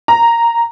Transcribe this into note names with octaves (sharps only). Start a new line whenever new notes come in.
A#5